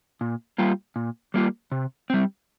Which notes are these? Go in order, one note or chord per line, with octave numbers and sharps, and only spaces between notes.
A#2
G3 A#3 F4
A#2
G3 A#3 F4
C3
G3 C4